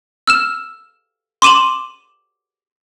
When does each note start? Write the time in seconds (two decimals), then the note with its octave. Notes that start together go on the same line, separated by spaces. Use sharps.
0.27 E6 F6 E7
1.42 C6 D6 D#7 E7 F#7